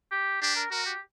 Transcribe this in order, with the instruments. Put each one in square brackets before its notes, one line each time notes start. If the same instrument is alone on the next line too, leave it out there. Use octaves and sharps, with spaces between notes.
[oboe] G4
[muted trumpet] D4 [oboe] G4
[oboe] A#4
[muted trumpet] F#4 [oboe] A#4
[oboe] G4